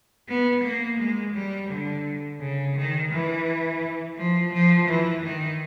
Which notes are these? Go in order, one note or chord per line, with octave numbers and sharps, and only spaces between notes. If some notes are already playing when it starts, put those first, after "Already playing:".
B3
A#3
G#3
G3
D3
C#3
D#3
E3
F3
F3
E3
D#3